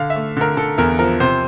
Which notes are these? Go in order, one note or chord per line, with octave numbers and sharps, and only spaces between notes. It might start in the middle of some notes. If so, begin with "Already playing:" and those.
Already playing: D3 F5
E5
A3
D3 A#4
D3 A4
E2 A#4
F3 A#4
C3 C5